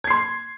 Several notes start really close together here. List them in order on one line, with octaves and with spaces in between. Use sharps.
G#6 C7 C6